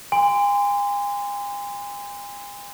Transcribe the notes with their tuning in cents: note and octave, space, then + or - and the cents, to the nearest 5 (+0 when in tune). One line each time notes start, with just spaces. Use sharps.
G#5 -40 C6 -25